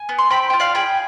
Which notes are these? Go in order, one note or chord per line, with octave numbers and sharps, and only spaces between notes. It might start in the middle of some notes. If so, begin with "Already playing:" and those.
Already playing: G#5
B3
C6
C4 G5 B5
F4 G5
D5 F5
G#4 G5 B5